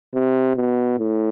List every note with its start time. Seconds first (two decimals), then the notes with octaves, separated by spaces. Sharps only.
0.15 C3
0.56 B2
0.99 A2